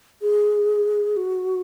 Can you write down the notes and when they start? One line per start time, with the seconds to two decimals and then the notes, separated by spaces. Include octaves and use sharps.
0.22 G#4
1.16 F#4